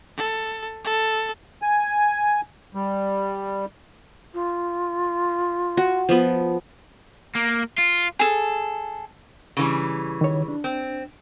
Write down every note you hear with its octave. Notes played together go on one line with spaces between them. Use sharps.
A4
A4
G#5
G3
F4
F#4
F3 B3
A#3
F4
G#4 A4
C#3 E3 G3
D#3 C#5
D4
C4